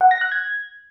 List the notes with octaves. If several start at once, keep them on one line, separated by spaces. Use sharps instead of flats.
F#5
A#6
F#6
G#6